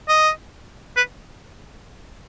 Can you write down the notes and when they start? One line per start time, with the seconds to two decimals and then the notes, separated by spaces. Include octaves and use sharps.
0.09 D#5
0.97 B4